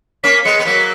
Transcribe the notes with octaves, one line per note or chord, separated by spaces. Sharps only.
A#3 C#4 B6
G#3 B3 C#7
B3
F#3 A#3 B6